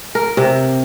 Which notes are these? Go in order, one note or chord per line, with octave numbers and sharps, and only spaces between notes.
A#4
C3